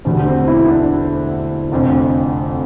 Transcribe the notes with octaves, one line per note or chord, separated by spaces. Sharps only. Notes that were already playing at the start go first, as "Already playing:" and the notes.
E1 D2 D3 G3 D4
C4
E4
E4
D4
F1 F2 D3